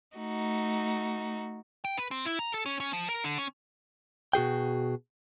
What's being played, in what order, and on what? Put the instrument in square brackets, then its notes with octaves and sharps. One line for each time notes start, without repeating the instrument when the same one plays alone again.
[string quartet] A3 D#4 F#4
[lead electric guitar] G5
B4
C4
E4
A#5
A4
C#4
C#4
F3
A#4
D3
C#4
[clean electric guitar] B2 F#4 G#4 G5